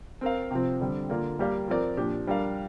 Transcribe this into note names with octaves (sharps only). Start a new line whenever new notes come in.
C4 A#4 F5
C3 F3 C4
D3 G3 C4
D3 A#3 F4 D5
G3 A#3 G4 D5 F5
F3 C4 A#4 D5
A#2 F3 D4 G4
G3 D4 A#4 F5